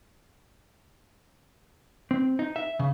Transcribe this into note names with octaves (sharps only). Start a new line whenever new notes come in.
C4
D#4
E5
C#3